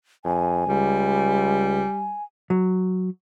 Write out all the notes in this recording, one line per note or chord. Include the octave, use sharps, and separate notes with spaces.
F2 G#5
C#2 G3
F#3